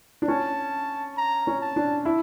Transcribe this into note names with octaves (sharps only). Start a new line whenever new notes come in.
D4
C#4 A5
A#5
C#4
A5
D4
E4